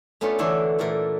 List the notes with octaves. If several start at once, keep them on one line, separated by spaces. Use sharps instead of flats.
A3 B3 C#4 D4 F4
D3 E3 D4 F#4
A#2 E3 A3 A#4 C6